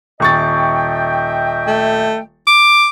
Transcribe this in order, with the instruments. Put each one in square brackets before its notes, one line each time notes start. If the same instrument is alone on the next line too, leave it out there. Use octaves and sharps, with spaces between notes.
[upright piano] D#1 C#6 A6 [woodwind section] D#5 E5 G5
[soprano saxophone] A3
D6